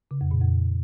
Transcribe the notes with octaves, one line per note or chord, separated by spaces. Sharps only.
C#3
F2
A#2
F2